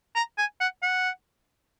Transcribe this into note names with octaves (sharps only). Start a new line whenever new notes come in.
A#5
G#5
F#5
F#5